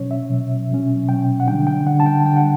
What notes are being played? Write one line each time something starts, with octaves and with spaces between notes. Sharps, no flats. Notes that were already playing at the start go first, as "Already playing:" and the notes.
Already playing: B2 F#3 C#4 C#5
E5
B2 F#3 C#4
B2 F#3 C#4
B2 F#3 C#4 G5
F#5
D3 G3 D4 G5
G5
D3 G3 D4 F#5
A5
G5
D3 G3 D4 G5
F#5